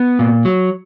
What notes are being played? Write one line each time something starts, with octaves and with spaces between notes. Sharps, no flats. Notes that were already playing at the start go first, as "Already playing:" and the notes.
Already playing: B3
A#2
F#3